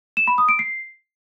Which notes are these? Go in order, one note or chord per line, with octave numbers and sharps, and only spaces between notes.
E7
B5
D#6
D7
C7